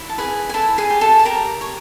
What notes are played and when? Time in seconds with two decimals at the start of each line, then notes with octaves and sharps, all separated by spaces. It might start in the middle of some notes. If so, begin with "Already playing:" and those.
Already playing: E4
0.09 A5
0.18 G#4 B4 G#5
0.49 G#5
0.54 E4 A4 A5
0.78 G#4 G#5
0.90 G4
1.01 A4 A5
1.19 A5
1.25 G4 A#4 A#5
1.61 C#5